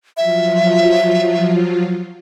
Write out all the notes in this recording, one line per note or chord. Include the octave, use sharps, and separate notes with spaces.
F3 F#3 F4 E5